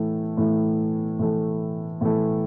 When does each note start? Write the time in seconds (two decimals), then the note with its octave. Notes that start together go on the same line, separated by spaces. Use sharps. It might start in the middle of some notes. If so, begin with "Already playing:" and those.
Already playing: A2 E3 A3
0.37 A2 E3 A3
1.19 A2 E3 A3
2.01 A2 E3 A3